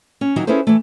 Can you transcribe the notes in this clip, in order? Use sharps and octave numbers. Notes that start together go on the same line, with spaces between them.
C#4
D#3 E3 F#3 D#4 F#4
C#4 E4 G#4 A4 B4 C5
E3 A3